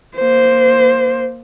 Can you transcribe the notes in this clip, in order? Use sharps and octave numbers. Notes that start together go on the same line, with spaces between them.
A#3 C5